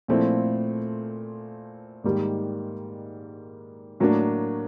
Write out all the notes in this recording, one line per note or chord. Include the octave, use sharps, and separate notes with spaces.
A#2 F3 A3 C4 E4
G#2 D#3 G3 A#3
A2 F#3 A#3 D4